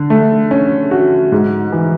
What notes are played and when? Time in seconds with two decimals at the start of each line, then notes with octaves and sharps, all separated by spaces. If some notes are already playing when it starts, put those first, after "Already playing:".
Already playing: D3
0.10 A3
0.51 C#4
0.91 F#4
1.32 G#2
1.72 E3